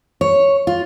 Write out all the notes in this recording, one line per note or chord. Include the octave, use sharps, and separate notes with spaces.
C#5
F4